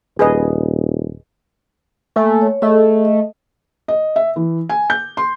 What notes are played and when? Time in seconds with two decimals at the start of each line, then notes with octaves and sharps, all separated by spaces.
0.19 D#1 G#4 B4 D#5
2.16 A3 A#3 G#5
2.42 C#5
2.62 A3 G#4 A4 D#5
3.05 D#5
3.88 D#5
4.16 E5
4.36 E3
4.69 G#5
4.90 G6
5.17 C6